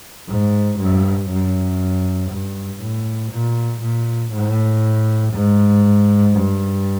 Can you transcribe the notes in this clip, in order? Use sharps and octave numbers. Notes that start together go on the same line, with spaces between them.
G#2
G2
F#2
G2
A2
A#2
A#2
A2
G#2
G2